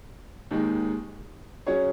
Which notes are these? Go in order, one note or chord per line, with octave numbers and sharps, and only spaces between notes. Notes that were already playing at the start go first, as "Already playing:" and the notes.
D#2 D#3 G#3 D#4
F#3 C#4 G#4 C#5